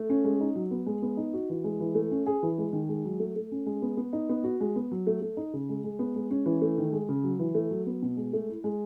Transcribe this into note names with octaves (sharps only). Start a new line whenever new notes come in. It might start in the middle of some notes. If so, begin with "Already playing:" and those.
Already playing: A3
C#4
G#3
D#4
F#3
B3
G#3
B3
D#4
F#4
E3
G#3
E3
A3
C#4
G#4
E3
G#3
D#3
G#3
F#3
A3
A3
C#4
G#3
B3
B3
D#4
B3
F#4
G#3
B3
F#3
A3
A3
D#4
C#3
G#3
G#3
B3
G#3
C#4
E3
A3
D#3
G#3
C#3
F#3
E3
A3
F#3
B3
B2
G#3
A3
E4
G#3